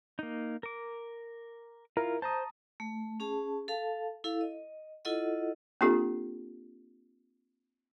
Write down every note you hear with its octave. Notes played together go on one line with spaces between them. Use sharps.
A#3 D#4
A#4 D6
E4 F4 A#4
C5 A5 A#5 D#6
A3
C#4 G#4 A5
A4 F5 A5
E4 A4 F5
D#5
E4 F4 A4 D#5 F#5
A#3 C4 D4 F4 G4 A4